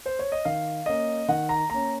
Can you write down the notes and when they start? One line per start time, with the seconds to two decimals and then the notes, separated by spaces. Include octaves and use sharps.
0.06 C5
0.19 C#5
0.32 D#5
0.45 D#3 F5
0.86 A#3 C#4 D#5
1.28 D#3 F#5
1.49 A#5
1.70 A#3 C#4 A#5